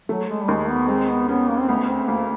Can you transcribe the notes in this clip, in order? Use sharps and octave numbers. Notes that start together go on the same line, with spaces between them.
F#3 A3
G#3
G3
D#2 G#3
B3
G#3 C4
B3
B3 C#4
A#3
C4
D2 B3
C4
D2 A#3